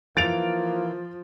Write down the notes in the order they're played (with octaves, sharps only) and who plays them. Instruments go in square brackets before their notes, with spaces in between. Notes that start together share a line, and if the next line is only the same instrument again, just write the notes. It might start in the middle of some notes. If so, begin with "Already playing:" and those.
[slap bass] E3 [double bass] F3 [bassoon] A#3 [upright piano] A6 D7 F7